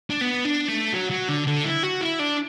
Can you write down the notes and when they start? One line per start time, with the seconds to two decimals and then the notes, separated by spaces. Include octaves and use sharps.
0.10 D4
0.21 B3
0.45 D4
0.69 A3
0.94 F#3
1.11 F#3
1.29 D3
1.47 D3
1.65 E4
1.83 F#4
2.01 E4
2.19 D4